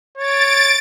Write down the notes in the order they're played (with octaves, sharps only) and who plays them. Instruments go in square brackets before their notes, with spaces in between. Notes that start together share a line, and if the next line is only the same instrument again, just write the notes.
[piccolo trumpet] C#5 [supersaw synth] A6 D7